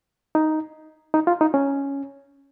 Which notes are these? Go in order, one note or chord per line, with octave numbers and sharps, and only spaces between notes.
D#4
D#4
F4
D#4
C#4